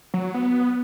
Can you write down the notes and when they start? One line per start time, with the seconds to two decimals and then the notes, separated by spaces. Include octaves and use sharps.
0.14 F#3
0.34 B3